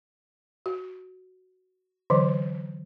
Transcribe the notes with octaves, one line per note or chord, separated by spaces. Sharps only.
F#4
D3 E3 F#3